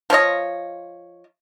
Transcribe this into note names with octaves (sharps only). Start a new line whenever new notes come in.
F3 F4 C#5 D#5